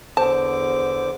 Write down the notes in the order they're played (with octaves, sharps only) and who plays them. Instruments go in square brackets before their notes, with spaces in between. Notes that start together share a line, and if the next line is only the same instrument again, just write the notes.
[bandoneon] E2 D3 D6 [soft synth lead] C5 [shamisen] A5